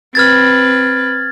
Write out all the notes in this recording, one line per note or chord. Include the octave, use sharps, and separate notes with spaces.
C4 B4 F6 G#6 A6